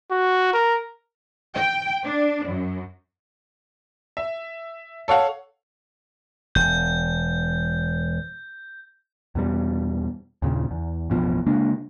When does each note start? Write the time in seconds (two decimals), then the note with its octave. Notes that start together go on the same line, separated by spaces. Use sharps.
0.11 F#4
0.54 A#4
1.54 G5
2.03 D4
2.46 F#2
4.17 E5
5.08 A4 C#5 F5 F#5
6.55 E1 G6
9.35 E2 B2 G3
10.42 D#2 A#2 C#3
10.71 E2
11.10 A1 F2 B2 F3
11.46 C#3 G#3 A#3 D4